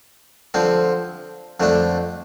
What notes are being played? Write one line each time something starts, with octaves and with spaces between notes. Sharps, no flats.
D3 F3 C4
F2 D3 A3 D4